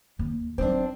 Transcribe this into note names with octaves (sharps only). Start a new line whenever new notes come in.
D#2
F#3 C4 D4 D#4